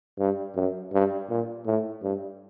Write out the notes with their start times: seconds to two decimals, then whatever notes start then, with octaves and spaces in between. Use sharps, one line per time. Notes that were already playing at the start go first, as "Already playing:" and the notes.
0.19 G2
0.56 F#2
0.93 G2
1.29 A#2
1.66 A2
2.03 G2